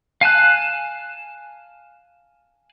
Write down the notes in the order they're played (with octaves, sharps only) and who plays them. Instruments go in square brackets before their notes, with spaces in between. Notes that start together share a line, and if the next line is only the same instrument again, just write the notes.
[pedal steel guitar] F5 G#5 A5 F#6